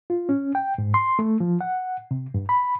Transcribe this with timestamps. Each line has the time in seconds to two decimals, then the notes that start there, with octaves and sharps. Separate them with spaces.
0.10 F4
0.29 C#4
0.55 G5
0.78 G#2
0.94 C6
1.19 A3
1.40 F3
1.61 F#5
2.11 C3
2.34 G2
2.49 B5